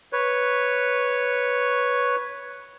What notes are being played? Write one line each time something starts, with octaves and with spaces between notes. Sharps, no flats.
B4 C#5